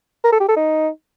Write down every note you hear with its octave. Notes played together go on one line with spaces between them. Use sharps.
A#4
A4
G4
A4
D#4